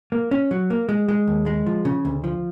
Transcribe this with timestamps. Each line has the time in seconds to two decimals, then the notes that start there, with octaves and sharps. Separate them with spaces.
0.12 A#3
0.31 C#4
0.51 F#3
0.70 A#3
0.89 G#3
1.08 G#3
1.27 D#2
1.46 G#3
1.66 F3
1.85 C#3
2.05 D2
2.24 F3